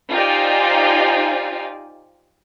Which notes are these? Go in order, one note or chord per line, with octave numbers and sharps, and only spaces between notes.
D#4 F4 G4 C5 D5 G#5